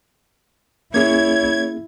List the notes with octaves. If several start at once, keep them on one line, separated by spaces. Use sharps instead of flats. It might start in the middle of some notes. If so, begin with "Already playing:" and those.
A#3 C#4 E4 G#4 C#5 G#6